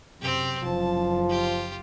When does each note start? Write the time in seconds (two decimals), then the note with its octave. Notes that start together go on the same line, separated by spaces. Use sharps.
0.22 F#2 C3 C4 G4
0.64 F#1 F3 A5
1.30 F4 G4